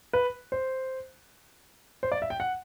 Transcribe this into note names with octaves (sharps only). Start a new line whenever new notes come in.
B4
C5
C5
D5
E5
G5
F#5